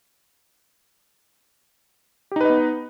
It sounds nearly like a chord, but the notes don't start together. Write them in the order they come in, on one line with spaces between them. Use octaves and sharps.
G4 D#4 B4 D#5 B3